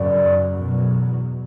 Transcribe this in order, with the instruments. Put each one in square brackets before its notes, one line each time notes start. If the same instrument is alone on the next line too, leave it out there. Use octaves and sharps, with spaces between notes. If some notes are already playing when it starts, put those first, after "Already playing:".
Already playing: [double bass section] F#2 C#3 F#3 [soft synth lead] D5
[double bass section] E2 B2 F#3